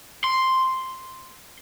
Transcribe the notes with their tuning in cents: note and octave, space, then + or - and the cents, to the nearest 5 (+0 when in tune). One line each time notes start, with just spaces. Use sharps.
C6 +0